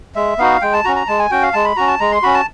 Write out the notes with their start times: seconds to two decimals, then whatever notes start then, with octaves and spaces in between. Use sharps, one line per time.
0.15 G#3 E5
0.38 B3 D#4 F#4 F5
0.62 G#3 G5
0.73 A5
0.84 C#4 F#4 A#5
0.96 A#5
1.08 G#3 A5
1.19 G#5
1.31 C#4 F#4 G5
1.42 F5
1.53 G#3 A5
1.65 B5
1.77 C#4 F#4 A#5
1.88 A5
2.00 G#3 A#5
2.12 C6
2.23 C#4 F#4 B5
2.34 A5